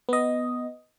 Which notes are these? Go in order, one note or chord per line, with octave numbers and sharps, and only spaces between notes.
B3 D#5